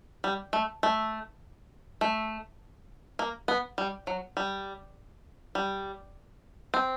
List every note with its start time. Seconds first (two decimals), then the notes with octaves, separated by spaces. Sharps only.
0.24 G3
0.53 A3
0.83 A3
2.01 A3
3.19 A#3
3.48 B3
3.78 G3
4.07 F#3
4.37 G3
5.55 G3
6.74 C4